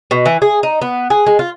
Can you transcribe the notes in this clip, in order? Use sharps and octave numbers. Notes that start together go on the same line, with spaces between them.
B2
E3
G#4
D#4
B3
G#4
G#3
F4